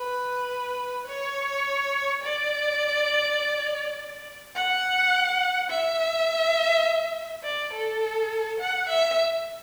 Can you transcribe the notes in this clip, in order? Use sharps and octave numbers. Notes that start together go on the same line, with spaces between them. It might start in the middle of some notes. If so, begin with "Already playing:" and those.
Already playing: B4
C#5
D5
F#5
E5
D5
A4
F#5
E5